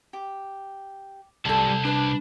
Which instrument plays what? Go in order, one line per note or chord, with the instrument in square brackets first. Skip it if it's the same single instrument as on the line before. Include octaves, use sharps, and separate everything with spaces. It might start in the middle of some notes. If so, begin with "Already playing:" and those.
[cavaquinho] G4
[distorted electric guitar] C2 [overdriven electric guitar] G3 A5 [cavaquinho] G#4 A4
[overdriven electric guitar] D4 [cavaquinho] B4 A5